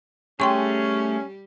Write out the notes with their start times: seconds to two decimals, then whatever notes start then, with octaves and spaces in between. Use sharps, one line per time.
0.40 G3 A3 C#4 G4 G#4 G5 C6 C#6